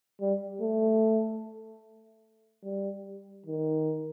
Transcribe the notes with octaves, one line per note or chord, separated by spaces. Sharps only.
G3
A3
G3
D#3